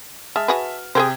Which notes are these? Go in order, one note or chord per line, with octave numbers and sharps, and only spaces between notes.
G#3 E5 A5 F6
F#4 G#4 B4
C3 G#4 A#4 C5 G5 G#6